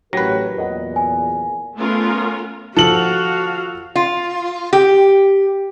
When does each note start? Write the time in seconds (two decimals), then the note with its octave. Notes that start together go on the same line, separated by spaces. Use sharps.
0.13 A1 F#3 G4 A#4 B4 C#5 G5 A#6
0.57 E2 A#2 A#4 D#5 F#5
0.96 G#5
1.77 A3 B3 C#4 F4 A#4
2.77 F3 F#4 A4 F5 F#7
3.96 F4
4.73 G4